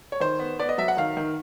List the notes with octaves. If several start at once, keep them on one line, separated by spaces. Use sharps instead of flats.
C#5
D#3 C5
B3
B3 D5
D#5
F#3 E5
F#5
D#3 F5
D#3